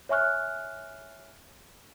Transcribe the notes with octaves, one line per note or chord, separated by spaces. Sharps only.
C#5 E5 G#5 C#6 F6 F#6